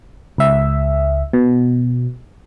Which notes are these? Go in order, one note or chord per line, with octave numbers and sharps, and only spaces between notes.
C#2 E5
B2